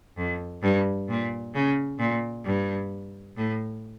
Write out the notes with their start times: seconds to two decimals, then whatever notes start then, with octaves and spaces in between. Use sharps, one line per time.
0.17 F2
0.63 G2
1.09 A#2
1.55 C#3
1.99 A#2
2.45 G2
3.37 A2